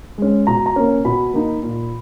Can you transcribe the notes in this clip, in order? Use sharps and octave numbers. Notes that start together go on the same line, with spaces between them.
G#3 C#4
B2 A#5
A#5
A#3 C#4
B2 B5
A#3 D#4
A#2